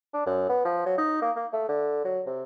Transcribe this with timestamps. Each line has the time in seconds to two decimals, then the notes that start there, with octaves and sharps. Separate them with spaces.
0.14 D4
0.26 F#2
0.49 B3
0.65 F3
0.86 F#3
0.98 D#4
1.22 A#3
1.36 A#3
1.53 A3
1.69 D3
2.04 F#3
2.26 C3